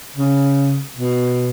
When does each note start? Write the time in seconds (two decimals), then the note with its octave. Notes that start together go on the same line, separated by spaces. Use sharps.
0.16 C#3
0.98 B2